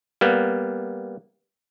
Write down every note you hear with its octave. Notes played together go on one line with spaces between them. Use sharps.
G3 A#3 B3